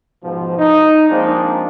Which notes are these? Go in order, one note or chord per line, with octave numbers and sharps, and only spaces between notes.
G#2 B2 F3
D#4
F3 G#3 A#3 C4 D4